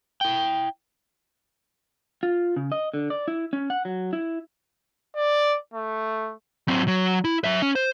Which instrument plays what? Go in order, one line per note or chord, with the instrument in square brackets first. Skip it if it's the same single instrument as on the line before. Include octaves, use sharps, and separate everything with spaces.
[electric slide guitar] E4 G5
F4
C#3
D#5
D3
D5
E4
C#4
F#5
F#3
E4
[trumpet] D5
A3
[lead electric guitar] F#3 C4
F#3
E4
F#3 E5
C#4
C5